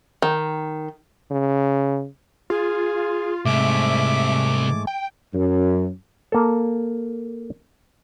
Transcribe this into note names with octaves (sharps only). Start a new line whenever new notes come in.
D#3
C#3
F4 G#4
C2 G#2 G#3 A3 E5 D6
G5
F#2
A#3 A4